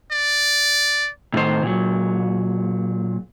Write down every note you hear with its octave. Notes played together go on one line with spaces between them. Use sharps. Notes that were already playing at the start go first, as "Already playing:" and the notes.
D5
A2 D#3 C5
A#2 F#3